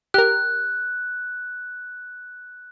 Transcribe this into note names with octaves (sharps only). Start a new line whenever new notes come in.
G4 A#4 F#6